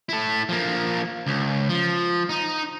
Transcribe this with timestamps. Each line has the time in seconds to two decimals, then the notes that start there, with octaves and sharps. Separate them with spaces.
0.09 E4 A4
0.49 F3 A#3
1.27 C#2
1.69 F3
2.29 D#4